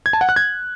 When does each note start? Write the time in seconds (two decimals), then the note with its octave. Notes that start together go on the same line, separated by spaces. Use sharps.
0.06 G#6
0.13 A5
0.21 F#5
0.29 F#6
0.36 G#6